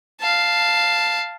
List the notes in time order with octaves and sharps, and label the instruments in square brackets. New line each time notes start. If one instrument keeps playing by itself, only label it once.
[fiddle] F5 A5